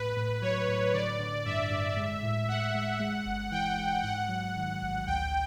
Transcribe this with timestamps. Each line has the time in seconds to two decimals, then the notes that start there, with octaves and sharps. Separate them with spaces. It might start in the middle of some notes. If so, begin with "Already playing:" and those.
Already playing: A2 B4
0.16 A2
0.41 F#3 C#5
0.68 A2
0.93 D3 D5
1.19 D3
1.45 G2 E5
1.71 G2
1.96 G#3
2.23 A2
2.48 A2 F#5
2.75 G#3
3.00 G#3
3.25 G1
3.51 E3 G5
3.78 G#3
4.03 G#2 F#5
4.29 F#3
4.56 D#3
4.81 A1
5.07 D2 G5